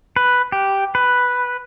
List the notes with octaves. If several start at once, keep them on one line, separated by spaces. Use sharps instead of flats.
B4
G4
B4